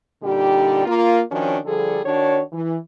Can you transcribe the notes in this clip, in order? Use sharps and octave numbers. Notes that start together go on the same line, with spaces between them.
A#2 D3 G3 D#4 G4
A#3 F4
D#3 F3 C#4 D4 F#4 C#5
D3 F3 G3 G#4 A4
D#3 D4 F#4 C#5
E3